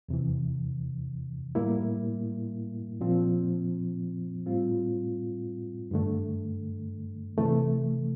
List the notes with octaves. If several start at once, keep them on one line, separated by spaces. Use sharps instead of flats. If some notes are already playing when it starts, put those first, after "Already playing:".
E2 C3 E3
A2 G3 A#3 E4
A#2 F3 C4
A2 G3 C4 F4
G2 D3 A3
C3 E3 A3